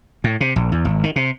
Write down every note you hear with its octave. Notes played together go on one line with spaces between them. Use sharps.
A2
C3
A#1
E2
G#1
D#3
C3